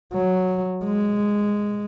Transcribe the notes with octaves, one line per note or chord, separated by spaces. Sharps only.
F#3
G#3